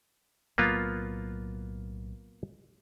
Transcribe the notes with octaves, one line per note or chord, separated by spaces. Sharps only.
B1 A2 F#3 A#3 B3 F4